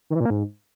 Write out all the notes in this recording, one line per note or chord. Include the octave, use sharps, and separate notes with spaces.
D#3
E3
A#2
A#3
G#2